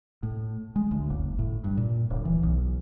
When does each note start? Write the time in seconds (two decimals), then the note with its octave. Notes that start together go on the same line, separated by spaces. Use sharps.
0.23 A2
0.76 G#3
0.91 D2
1.10 F#1
1.39 A2
1.64 G2
1.77 A#2
2.10 D1
2.25 E3
2.43 B1